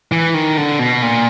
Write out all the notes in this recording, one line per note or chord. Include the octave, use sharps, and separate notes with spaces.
E3
D#3
D3
B2
A#2